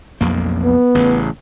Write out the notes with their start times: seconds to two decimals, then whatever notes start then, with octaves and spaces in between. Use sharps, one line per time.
0.21 B1 F2 A#3
0.65 B3
0.95 A1 C#3